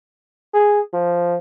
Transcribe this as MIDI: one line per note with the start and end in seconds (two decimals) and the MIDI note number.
0.54 0.81 68
0.93 1.38 53